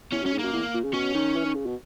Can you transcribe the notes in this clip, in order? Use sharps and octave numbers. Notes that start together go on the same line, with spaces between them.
E2 C#4
F#2 C#4
G#2
F#2 A#3
E2
A#2
C#3
B2 C#4
D#3
E3
D#3
C#3
B2